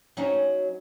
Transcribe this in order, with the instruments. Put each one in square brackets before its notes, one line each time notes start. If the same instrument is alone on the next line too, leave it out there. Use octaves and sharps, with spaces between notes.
[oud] F#3 C#4 D#4